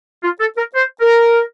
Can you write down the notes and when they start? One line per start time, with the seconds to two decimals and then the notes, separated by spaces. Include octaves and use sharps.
0.23 F4
0.40 A4
0.57 A#4
0.74 C5
1.01 A#4